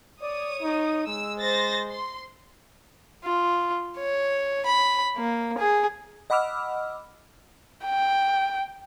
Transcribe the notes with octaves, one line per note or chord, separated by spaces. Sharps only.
C#5 D5 D#6
D#4
G#3 E6
C5 A6 A#6
C6
F4
C#5
B5
A#3
G#4
D#5 F#5 B5 D6 E6 F6
G5